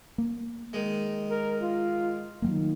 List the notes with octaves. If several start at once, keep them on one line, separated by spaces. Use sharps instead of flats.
A#3
D#3 G#3
A#4
F4
D#3 F#3 G3 A#3